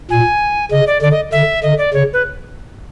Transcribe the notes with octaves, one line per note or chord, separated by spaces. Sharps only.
A#2 G#5
C#3 D#5
D5
D3 D5
D#5
D3 E5
D3 D#5
D5
C#3 C#5
B4